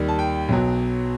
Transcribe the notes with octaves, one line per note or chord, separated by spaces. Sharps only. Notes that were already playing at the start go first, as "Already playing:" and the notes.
Already playing: D#2 D#3 G3
A5
G5
B1 B2 F#3